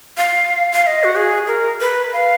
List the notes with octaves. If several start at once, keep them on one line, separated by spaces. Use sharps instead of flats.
F5
F5
F5
D#5
F#4
G#4
A#4
B4
F5